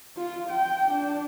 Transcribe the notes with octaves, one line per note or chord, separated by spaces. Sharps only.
F4
G5
D4